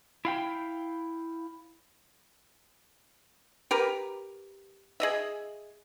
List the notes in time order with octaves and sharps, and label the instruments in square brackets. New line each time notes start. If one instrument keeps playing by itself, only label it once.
[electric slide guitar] E4 F5 G5
[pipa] G4 A#4 B4
G#4 D#5 E5